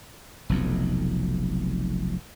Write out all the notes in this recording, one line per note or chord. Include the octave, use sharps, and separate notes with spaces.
F1 B1 F2